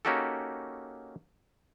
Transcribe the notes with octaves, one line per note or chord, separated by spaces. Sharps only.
A#3 C#4 D#4 F#4 G4 A4